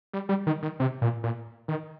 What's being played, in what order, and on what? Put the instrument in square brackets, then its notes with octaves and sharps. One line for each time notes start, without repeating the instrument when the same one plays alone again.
[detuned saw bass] G3
G3
D#3
D#3
C3
A#2
A#2
D#3